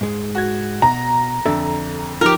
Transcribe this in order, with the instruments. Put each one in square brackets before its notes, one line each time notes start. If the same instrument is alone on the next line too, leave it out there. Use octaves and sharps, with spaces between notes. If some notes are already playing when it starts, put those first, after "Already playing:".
[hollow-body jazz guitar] G#2 G#3
[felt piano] F#4 G#6
[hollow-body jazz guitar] B2 [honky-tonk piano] A#5
[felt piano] F2 D3 [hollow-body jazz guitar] A4 D5 E5
[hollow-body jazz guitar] F3 D#4 F4 [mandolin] G4 A#4